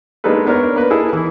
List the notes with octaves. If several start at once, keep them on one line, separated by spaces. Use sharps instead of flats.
G#3 A#3 D4 D#4 A4 B4
B3 D4 A#4 C#5
A#3 A#4 B4
E4 G#4 A4 D#5
E3 E4